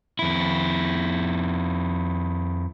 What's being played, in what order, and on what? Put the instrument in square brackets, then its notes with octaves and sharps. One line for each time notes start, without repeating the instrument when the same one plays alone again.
[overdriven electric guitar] F2 E4